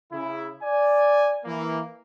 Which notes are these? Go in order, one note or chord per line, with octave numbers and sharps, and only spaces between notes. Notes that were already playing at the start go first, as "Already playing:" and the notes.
C#3 E4
D5 G#5
E3 A#3